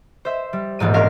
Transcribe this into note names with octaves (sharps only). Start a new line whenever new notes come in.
C5 E5
G3
E1 A#1 G#2 D#7
C4 C#4 A#4 C5 F5